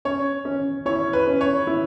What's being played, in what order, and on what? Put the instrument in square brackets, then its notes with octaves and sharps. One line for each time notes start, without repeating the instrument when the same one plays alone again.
[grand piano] C#4 [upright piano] C#5
[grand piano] C#4
[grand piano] E4 [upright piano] C#5
[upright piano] B4
[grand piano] C#4
[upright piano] C#5
[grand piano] E4